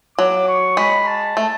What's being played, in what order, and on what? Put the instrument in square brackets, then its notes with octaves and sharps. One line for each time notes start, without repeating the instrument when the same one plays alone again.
[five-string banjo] F#3 [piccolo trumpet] D6
[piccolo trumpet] C#6
[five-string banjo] G#3 [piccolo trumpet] B5
[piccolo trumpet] A5
[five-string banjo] A3